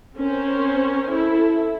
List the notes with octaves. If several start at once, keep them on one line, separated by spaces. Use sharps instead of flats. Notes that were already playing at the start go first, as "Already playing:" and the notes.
C4 C#4 A#4 C5
E4 A4